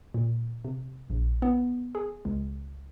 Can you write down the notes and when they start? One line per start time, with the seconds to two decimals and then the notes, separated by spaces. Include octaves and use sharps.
0.14 A#2
0.65 C3
1.10 A#1
1.42 B3
1.95 G#4
2.25 C#2